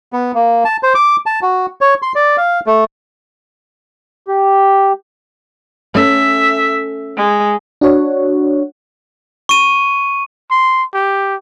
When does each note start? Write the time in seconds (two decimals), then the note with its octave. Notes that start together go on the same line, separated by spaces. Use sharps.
0.13 B3
0.35 A#3
0.65 A5
0.83 C5
0.95 D6
1.26 A5
1.42 F#4
1.81 C#5
2.02 C6
2.15 D5
2.37 F5
2.66 A3
4.28 G4
5.95 A3 C#4 E5
7.17 G#3
7.81 D4 F#4 C#5 F#5
9.49 C#6 D#7
10.50 C6
10.94 G4